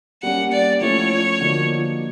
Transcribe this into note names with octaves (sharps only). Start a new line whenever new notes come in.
G3 A#3 C#4 F#5
D5
F3 A3 C#4 E4 C#5
D3 F3 A#3 D#4 F#4